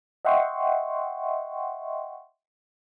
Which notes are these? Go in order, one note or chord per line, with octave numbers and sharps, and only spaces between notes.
D#5 E5 F#5 G5 C6 C#6